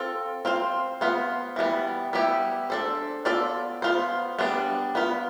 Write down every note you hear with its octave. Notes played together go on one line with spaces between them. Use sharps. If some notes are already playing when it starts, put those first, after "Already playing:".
Already playing: C4 F4 A4
C4 F4 C5
B3 F4 C5
E3 G3 B3
G3 B3 E4 G4
D4 A4 C5
B3 F4 A4 D5
B3 F4 C5
G3 B3 D4
B3 F4 B4